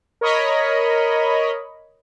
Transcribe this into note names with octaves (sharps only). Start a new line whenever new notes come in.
A#4 C#5 D#5 B5